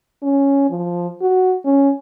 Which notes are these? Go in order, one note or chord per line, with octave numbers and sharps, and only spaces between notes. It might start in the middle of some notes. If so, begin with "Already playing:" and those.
C#4
F3
F#4
C#4